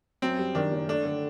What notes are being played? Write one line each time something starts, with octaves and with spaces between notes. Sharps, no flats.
F#2 C4
G3
D#3 D4
F#1
A3 D4
D3